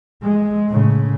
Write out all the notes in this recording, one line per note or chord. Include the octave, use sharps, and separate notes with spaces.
G#3
A2 C#3